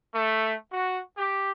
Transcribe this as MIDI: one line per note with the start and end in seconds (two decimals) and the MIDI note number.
0.15 0.54 57
0.72 0.99 66
1.17 1.50 67